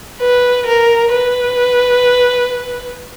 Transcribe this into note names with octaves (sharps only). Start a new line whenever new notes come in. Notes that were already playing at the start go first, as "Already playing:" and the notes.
B4
A#4
B4